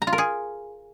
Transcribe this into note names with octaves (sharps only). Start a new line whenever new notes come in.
A#5
F4
A#4
G#4